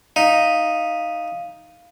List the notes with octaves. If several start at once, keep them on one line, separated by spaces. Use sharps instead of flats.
D#4 F5